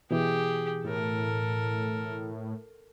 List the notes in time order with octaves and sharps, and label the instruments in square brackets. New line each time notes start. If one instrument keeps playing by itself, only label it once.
[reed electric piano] B2 E3 [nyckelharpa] G4 G#4
[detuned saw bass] A2 [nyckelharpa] A4 A#4